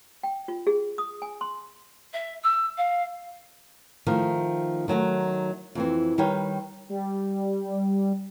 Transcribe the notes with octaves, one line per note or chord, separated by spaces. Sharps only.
G5
F4
G#4
D#6
G#5
C6
E5
E6
F5
D#3 F3 A3
D#3 F#3 A3 F#4
F2 E3 C4
D#3 G3 G4 B4 C#5 G5
G3